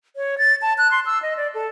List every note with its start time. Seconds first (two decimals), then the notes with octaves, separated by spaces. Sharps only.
0.16 C#5
0.38 A6
0.62 A5
0.78 F#6
0.91 C6
1.06 E6
1.22 D#5
1.37 D5
1.54 A4